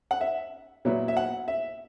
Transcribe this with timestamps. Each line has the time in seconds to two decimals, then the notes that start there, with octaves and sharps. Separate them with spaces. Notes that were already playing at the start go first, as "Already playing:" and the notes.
0.11 F#5
0.21 E5
0.85 A#2 F#3 B3 E4
1.08 E5
1.17 F#5
1.48 E5